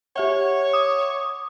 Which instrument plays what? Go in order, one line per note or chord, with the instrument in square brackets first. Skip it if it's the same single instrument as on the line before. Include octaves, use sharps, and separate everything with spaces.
[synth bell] G4 E5 F#5 [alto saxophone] C#5
[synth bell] D6 D#6